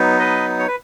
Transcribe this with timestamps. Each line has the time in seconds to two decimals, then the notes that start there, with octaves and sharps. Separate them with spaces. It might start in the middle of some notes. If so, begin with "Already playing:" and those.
Already playing: F#3 B3 D#4
0.19 B4 D#5
0.59 C#5
0.67 B4